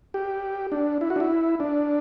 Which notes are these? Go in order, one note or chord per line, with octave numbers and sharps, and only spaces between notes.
G4
D4
E4
F#4
D4
E4
D4